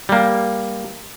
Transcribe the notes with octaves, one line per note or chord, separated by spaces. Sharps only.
G3 A#3